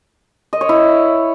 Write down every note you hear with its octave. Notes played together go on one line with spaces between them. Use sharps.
D#5
C#5
E4